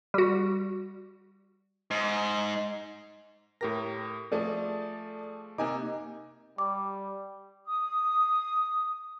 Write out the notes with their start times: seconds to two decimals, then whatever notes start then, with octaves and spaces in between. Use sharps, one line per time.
0.14 G3 F#4
1.91 G#2
3.61 A2 G4 A#4 A#6
4.32 F3 A3 G#4 A4 D5
5.58 C3 A#3 D#4 G#5 D6
6.58 G3 D6
7.66 D#6